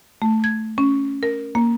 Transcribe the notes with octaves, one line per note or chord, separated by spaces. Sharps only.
A3
G#6
C#4
A#4
A#3